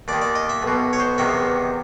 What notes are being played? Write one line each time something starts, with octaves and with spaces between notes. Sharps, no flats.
D#2 D#3 D5
D5
D#5
E5
B1 B2
C#5
C5
E2 C3 D#3 E5